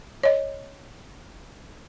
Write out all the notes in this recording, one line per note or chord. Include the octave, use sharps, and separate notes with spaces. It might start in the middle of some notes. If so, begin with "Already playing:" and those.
C#5 D#5